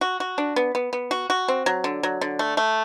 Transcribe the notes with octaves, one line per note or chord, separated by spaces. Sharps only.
F#4
F#4
D4
B3
B3
B3
F#4
F#4
C4
F#3
D3
F#3
D3
A3
A3